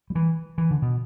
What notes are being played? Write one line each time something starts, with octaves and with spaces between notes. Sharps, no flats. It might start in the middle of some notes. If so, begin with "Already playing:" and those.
G3
E3
E3
D3
B2